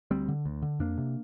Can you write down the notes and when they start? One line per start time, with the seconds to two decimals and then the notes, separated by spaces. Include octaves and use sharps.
0.11 D2 G3 C4
0.28 D3
0.46 D2
0.62 D3
0.80 F2 A#3 D4
0.98 C3